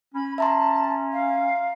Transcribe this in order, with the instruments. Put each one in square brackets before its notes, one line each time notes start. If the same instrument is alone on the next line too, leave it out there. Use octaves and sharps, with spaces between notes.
[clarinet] C#4 [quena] B5
[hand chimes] E5 A#5 C6 [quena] A5
[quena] F5